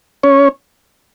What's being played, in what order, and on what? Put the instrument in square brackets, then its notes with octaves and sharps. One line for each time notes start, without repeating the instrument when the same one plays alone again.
[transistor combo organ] C#4 C#5